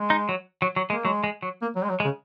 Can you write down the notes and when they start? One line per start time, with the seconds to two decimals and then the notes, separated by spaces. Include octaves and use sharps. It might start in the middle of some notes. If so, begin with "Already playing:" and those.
Already playing: G#3
0.10 D#4
0.29 F#3
0.62 F#3
0.76 F#3
0.90 G#3 A#3
1.05 F#3 G#3
1.24 G#3
1.43 F#3
1.62 A#3
1.76 F#3
1.83 G#3
1.90 F#3
2.00 G#3
2.04 C#3